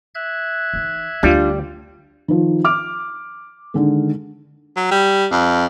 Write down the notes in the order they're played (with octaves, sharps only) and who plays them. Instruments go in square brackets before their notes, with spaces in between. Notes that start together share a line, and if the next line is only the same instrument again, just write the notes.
[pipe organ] E5 F#6 G#6
[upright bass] E3 D#4
[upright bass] D2 [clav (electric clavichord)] G3 [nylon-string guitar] D4 F4
[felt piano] D#3 F3
D6 F6
D3 D#3 G#3
[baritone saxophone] F#3
G3
F2